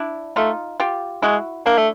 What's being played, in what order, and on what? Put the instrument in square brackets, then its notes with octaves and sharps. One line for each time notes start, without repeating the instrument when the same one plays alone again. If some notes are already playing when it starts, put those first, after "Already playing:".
Already playing: [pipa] D4 E4
[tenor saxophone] A3 [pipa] D#4 F4
[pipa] F4 G4
[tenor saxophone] G#3 [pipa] E4 F#4
[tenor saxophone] A#3 [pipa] D4 E4
[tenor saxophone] A3